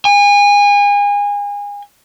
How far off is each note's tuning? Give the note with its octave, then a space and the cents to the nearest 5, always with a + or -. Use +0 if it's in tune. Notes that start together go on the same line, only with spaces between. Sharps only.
G#5 -30